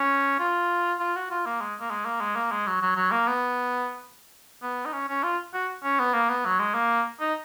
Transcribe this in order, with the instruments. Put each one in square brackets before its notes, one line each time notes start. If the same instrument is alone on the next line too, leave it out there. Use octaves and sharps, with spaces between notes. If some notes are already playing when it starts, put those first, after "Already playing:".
Already playing: [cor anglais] C#4
F4
F4
F#4
F4
A#3
G#3
A#3
G#3
A#3
G#3
A#3
G#3
F#3
F#3
F#3
A#3
B3
B3
D#4
C#4
C#4
F4
F#4
C#4
B3
A#3
B3
F#3
G#3
A#3
D#4